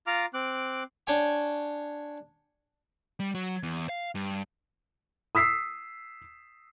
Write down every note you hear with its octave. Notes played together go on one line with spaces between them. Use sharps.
F4 F5 A#5 D6 F6
C4 D6 F#6
D4 C#5 G5 G#5 C#6
G3
F#3
E2
F5
G2
D#6 E6 B6 C7